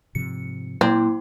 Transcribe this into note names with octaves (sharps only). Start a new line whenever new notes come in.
G#2 C3 F3 C#7
A#2 F#3 A#3 C4 E4